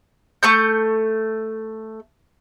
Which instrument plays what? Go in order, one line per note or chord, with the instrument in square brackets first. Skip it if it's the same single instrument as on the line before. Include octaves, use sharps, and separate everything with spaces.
[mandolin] A3 C#6 G6